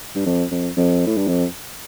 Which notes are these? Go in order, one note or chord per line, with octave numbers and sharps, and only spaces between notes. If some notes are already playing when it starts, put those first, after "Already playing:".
G2
F2
F2
F2
A2
G2
F2